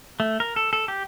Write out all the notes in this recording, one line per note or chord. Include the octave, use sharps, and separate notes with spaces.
A3
A#4
A4
A4
G4